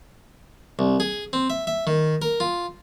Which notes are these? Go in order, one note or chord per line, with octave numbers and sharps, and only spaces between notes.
C2
G#4
C4
E5
E5
D#3
A#4
F4